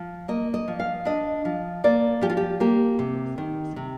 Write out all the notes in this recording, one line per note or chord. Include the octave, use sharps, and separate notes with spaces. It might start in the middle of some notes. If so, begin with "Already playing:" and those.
Already playing: F3
A#3 D#5
D#5
F3
F5
D4 D#5
F3
A#3 D5
F3 G4
F4
G4
A#3 G4
C3
D#3
C3